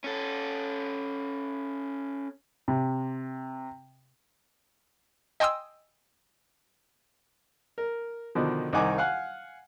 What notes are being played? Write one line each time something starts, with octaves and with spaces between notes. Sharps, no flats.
C#4 A4
C3
D#5 G5 G#5 C6 D#6 E6
A#4
B2 D3 D#3 F3
C2 D#3 D#4 F#5 G#5 D6
F5 F#5 G#5 F#6